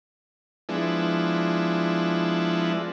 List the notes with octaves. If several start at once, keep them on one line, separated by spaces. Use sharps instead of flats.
F3 G#3 B3 D4 E4